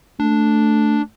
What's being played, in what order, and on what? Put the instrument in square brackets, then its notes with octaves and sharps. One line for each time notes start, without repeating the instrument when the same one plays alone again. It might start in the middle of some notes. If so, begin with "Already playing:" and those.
[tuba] A3 [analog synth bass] D4